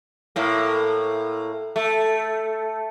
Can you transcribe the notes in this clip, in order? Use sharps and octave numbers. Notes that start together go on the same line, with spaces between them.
A2 A#3
A3